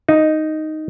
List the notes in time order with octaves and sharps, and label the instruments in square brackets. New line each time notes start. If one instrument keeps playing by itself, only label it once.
[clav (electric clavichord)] D#4